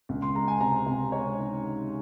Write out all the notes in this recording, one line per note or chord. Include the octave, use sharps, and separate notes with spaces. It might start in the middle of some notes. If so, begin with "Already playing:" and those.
C#2
C6
G#3 A#5
G#5
C3 A#5
C3
G#3 C#5
D#3
D#3